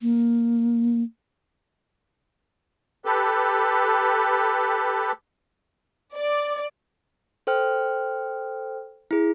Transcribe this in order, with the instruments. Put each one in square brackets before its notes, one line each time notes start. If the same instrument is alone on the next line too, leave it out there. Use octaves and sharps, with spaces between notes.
[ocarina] A#3
[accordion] G4 A4 B4
[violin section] D5
[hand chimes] A4 C5 G5 F6
E4 G#4